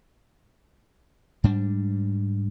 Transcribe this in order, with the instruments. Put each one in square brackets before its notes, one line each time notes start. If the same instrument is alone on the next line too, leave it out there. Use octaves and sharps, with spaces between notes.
[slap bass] G#2 G3 D4